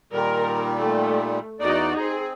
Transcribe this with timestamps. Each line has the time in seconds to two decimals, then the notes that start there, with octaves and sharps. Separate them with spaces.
0.12 A#2 D#3 G3 A#4
0.78 A3
1.60 E2 D#4 F#4 D5
1.99 C4 G#4